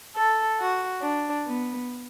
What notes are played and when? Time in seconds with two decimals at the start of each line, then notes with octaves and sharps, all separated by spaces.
0.16 A4
0.60 F#4
1.02 D4
1.46 B3